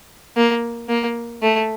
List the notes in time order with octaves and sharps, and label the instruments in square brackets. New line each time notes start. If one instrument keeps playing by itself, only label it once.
[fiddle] A#3
A#3
A3